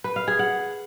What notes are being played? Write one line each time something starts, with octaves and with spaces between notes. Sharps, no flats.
B4
F5
G#4
F#5